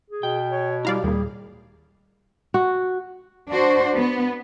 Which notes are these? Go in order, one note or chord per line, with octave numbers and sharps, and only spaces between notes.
G#4
B2 G5
C#5
G3 E4 G4 D5 F5 A#5
D#2 A#2 G3 G#4
F#4
D4 F#4 C5
B3